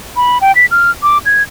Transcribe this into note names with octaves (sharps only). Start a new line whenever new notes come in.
B5
G5
B6
F6
D6
G#6